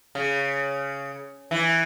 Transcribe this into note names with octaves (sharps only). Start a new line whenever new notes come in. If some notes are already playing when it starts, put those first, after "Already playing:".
C#3
E3